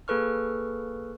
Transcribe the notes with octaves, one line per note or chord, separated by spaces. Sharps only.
A#3 G#4 A4 B4 C#6 F6